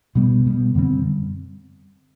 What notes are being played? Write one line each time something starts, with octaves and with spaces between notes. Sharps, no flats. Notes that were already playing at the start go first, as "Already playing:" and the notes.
B2 G3 B3
B2 G3 B3
F#2 D3 G3 C4